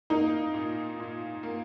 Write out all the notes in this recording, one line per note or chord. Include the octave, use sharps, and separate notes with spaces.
A#3 D#4
A#2
A#2
A#3